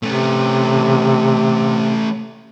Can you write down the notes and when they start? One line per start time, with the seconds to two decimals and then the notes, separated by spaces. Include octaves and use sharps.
0.04 C3 A3 C#4